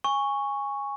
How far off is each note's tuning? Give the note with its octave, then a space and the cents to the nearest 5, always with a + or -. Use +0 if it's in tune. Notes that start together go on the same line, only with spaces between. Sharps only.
G#5 -15 C#6 +0